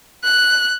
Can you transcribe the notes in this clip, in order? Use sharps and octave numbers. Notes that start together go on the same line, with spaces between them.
F#6